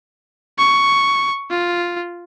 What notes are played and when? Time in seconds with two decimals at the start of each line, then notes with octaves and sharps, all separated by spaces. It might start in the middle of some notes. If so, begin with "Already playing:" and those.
0.59 C#6
1.50 F4